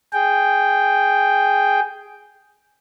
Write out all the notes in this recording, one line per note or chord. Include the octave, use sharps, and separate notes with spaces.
G#4 G5